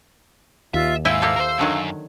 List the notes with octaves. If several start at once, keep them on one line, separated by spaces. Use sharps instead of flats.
D#2 F4 E5 E6
G#2 E4 F5 G5 G#5 E6
A#3 G4 A4
A#4 C5
F#2 D3 D#3 F#3